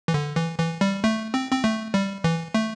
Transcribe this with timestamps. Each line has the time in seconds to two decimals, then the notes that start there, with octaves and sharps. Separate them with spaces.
0.08 E3
0.14 D3
0.36 E3
0.59 E3
0.81 G3
1.04 A3
1.34 C4
1.52 C4
1.64 A3
1.94 G3
2.24 E3
2.54 A3